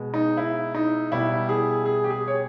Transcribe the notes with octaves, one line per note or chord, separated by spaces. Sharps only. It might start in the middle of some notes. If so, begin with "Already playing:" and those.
Already playing: B2 G#3
D#4
E4
D#4
B2 G3 E4
G#4
G#4
G4
G#4
C#5